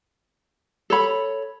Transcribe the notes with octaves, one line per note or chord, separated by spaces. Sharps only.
A4 C#5 B5